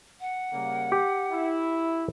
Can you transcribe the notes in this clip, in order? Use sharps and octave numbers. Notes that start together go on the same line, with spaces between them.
F#5
C#3 G3 A#3
G4
E4